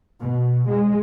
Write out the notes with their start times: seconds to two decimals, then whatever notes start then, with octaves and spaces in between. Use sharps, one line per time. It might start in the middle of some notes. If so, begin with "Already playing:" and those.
0.22 B2
0.70 G#3